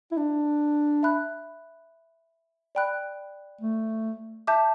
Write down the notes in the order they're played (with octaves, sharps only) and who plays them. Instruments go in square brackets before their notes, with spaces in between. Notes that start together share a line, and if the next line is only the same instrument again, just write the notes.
[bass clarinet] E4
D4
[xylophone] E5 B5 F#6
D5 G5 B5 F#6
[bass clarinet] A3
[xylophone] E5 A5 D6 G6